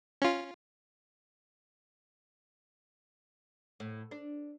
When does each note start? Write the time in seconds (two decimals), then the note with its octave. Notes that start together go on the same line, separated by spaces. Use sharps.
0.22 C#4 F4
3.80 A2
4.11 D4